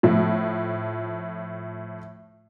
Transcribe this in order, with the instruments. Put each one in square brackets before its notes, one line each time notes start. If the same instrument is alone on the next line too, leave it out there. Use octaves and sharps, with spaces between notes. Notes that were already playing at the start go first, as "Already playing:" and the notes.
[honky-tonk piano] A2 F3